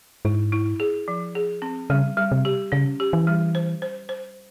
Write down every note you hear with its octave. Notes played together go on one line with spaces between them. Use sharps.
G#2 E4
E4
G#4
F3
G#4
C4
C#3 G3
G3
C3
G4
C#3 C#4
G4
E3
G3
C5
C5
C5